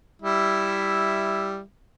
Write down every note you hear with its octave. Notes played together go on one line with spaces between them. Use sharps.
G3 E4 E5